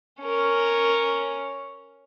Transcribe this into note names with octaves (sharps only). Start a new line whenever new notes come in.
C#4 A#4